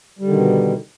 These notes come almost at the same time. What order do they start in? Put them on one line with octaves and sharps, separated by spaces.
G3 D3 D#3 B2